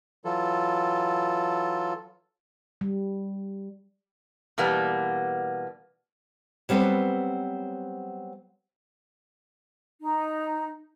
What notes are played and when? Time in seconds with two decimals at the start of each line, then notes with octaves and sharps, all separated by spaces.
0.25 E3 F#3 F4 A4
2.81 G3
4.58 B2 E3 G3 A#3 B3
6.69 F#3 G3 B3 C4 A4 B4
10.03 D#4